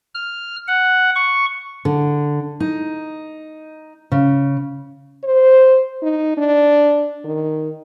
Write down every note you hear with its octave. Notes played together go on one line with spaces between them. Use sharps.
F6
F#5
C#6
D3
D#4
C#3
C5
D#4
D4
D#3